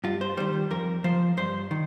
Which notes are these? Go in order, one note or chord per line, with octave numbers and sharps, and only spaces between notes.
G2 F4
C5
D#3 G3 C5
F2 A#4
F3 C5
G2 C5
D#3